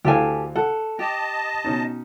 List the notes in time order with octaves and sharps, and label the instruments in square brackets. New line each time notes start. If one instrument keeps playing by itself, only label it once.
[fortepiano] D2 E4 F5 [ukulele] G4 A4 G#5
[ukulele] A4 [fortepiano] F#5
[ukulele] G4 [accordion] D#5 A5
[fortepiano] B2 C#4 D#4